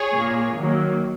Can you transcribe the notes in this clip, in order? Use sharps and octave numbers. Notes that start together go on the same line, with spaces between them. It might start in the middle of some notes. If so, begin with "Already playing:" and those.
Already playing: G#4 C#5
A#2 A#3
D#3 F#3 A#3